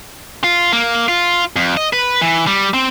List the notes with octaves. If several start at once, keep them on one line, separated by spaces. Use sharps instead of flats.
F4
A#3
F4
F2
D#5
B4
E3
G3
C4